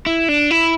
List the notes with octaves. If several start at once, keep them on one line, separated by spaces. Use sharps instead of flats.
E4
D4
E4